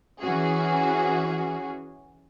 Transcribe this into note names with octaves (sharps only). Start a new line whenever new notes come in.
E3 C#4 F#4 G#4